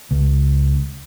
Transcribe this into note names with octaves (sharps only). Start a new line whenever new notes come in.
C#2